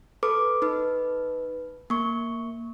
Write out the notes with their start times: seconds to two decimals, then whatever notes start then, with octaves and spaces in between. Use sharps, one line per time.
0.23 A4 B4 D6
0.62 D#4 B4
1.90 A#3 C#6